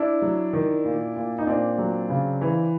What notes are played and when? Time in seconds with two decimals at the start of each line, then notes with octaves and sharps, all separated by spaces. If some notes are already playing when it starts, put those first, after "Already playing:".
Already playing: D4 E4
0.22 F#3
0.53 D#3
0.85 A#2
1.16 A#2
1.38 D#4
1.47 A#2 C4 D4
1.78 F#3
2.09 C#3
2.41 E3